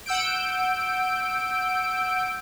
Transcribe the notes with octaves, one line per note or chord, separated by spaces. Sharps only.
F#5 E6 G6 D7